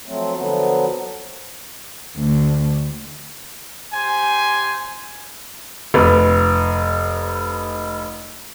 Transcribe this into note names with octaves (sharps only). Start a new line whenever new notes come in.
F3 F#3 A3 C4
D3 F3 F#3 B3
D2
G4 C5 G#5
F1 B4